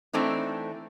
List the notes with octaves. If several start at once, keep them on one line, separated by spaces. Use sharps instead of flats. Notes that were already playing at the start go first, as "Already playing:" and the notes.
E3 A3 C4 D4 D#4